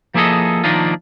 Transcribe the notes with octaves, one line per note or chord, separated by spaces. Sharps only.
F3 A#3 E4 G#4 A4 D#5
D#3 F3 A#3 D4 D#4 F4